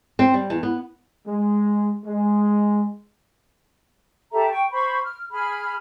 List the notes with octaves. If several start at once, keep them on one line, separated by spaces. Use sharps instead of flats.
C4
G3
E2
B3
G#3
G#3
G4 A4 E5 A#5
G5 C#6
C5 B5 C#6
F6
G#4 B5 F6